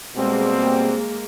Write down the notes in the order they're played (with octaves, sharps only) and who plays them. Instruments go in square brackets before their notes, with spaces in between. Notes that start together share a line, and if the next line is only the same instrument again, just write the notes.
[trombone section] B2 G3 C4 [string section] G#3 A#3